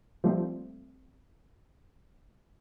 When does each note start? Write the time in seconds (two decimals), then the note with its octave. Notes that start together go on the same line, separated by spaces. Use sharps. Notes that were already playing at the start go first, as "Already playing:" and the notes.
0.24 F3 G3 A3 A#3 C4